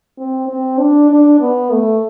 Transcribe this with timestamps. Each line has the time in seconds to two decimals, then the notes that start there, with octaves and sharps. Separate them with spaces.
0.18 C4
0.49 C4
0.79 D4
1.10 D4
1.41 B3
1.71 A3